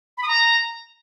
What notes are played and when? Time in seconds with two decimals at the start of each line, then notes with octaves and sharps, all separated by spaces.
0.18 B5
0.23 D#6
0.28 A#5